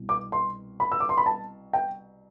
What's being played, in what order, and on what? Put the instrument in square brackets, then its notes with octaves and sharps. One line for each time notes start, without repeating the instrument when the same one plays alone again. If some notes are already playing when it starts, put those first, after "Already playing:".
Already playing: [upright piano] C2 B2
D6
C6
B5
E6
D6
C6
B5
A5
G5